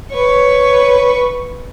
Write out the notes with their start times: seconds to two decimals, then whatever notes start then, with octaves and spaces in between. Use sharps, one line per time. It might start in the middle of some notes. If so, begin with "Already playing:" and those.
0.12 B4 C#5 C#6